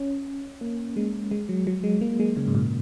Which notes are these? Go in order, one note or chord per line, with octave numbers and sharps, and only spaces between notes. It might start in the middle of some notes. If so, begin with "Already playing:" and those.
Already playing: C#4
A#3
G#3
G#3
F#3
F#3
G#3
A#3
G#3
C#3
G#2
A#2